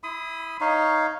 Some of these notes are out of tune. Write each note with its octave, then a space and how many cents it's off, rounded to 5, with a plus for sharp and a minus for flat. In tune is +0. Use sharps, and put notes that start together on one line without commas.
E4 -10 B5 +45 D#6 +10
D#4 +0 C#5 +0 F5 +0